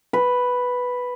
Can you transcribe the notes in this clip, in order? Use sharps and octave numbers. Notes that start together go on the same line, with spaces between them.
B4